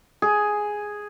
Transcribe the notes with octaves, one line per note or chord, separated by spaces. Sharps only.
G#4